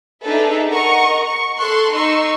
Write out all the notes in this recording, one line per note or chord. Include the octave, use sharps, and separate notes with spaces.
D4 D#4 G#4 A4 B4 E5
A#4 D#5 F#5 A#5 C#6
C#6
A4 C6 C#6 F#6
D#4 C6 C#6 E6